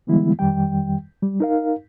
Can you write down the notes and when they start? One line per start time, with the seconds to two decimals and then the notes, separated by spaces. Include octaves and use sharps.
0.07 D3 E3 G3 G#3 B3 E4
0.39 F2 D#3 G3 G5
1.22 G3
1.40 D#4 A#4 F5